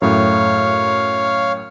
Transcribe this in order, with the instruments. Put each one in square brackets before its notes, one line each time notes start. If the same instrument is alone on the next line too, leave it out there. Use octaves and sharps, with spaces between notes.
[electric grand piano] F#2 A2 [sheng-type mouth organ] C#5 F5